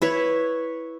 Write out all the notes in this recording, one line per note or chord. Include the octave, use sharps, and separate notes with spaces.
E4 B4 C#5